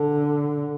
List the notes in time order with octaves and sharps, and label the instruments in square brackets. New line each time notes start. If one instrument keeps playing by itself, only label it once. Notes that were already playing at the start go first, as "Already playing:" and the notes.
Already playing: [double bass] D3